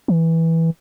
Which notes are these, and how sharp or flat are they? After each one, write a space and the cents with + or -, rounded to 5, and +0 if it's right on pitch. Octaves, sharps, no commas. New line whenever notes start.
E3 -10